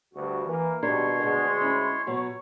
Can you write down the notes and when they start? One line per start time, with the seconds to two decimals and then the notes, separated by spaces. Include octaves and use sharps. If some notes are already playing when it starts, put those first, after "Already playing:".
0.14 D2 G2 F#4
0.45 E3 A#3 E4 A#4
0.83 G#1 B2 G3 D4 E4 A#4 C#5 C6
1.20 D2 G#3 D4 F#4
1.61 C#4 E4
2.07 B2 F#3 C#5